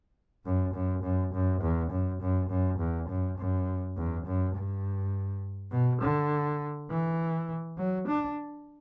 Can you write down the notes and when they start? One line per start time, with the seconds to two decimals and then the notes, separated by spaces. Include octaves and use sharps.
0.45 F#2
0.74 F#2
1.03 F#2
1.34 F#2
1.62 E2
1.91 F#2
2.22 F#2
2.50 F#2
2.79 E2
3.09 F#2
3.38 F#2
3.97 E2
4.27 F#2
4.55 G2
5.72 B2
6.02 D3
6.90 E3
7.78 F#3
8.08 D4